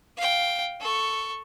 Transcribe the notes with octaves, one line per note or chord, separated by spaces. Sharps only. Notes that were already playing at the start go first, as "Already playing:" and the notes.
F5 G5
A4 C#6